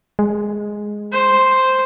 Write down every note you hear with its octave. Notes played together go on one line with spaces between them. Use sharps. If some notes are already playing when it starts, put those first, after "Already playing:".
G#3
C5